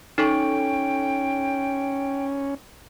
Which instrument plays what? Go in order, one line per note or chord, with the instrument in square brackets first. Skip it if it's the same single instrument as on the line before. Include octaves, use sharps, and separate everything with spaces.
[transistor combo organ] C#4 [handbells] D#4 A4 C#6 [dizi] G5